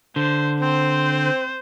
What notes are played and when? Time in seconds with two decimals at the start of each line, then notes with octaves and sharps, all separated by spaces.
0.16 D3 C5
0.61 C4 C5